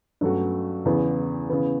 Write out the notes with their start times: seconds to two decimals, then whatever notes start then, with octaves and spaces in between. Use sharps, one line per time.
0.21 G2 F#3 A3 C#4 F#4
0.85 E2 C#3 E3 B3
1.49 C#3 E3 B3